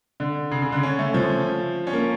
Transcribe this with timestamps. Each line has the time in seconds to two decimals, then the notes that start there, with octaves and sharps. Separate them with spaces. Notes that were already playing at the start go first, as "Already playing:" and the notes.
0.20 D3
0.51 C#3
0.62 C#3
0.72 D3
0.83 C#4
0.99 A3
1.14 F3
1.87 C#4
1.93 A#3